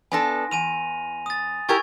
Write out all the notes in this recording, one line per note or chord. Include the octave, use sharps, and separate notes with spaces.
B3 D4 A4 G#5 C6 A#6
E2 G#5 D#7 F7
D#6 A6
E4 G4 A#4 G#5 C#6 G#6